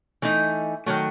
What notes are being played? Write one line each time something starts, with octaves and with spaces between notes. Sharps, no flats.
E3 A3 D#4
D#3 F#3 A3